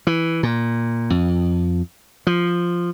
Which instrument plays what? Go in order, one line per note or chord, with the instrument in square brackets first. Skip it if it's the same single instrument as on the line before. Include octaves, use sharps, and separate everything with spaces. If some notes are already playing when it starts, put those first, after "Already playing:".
[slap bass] E3
A#2
F2
F3